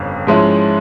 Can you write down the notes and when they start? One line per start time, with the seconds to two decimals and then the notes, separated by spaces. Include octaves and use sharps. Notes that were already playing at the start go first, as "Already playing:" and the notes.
Already playing: G1 F2 C#3
0.27 G#2 F3 G#3 C#4 E4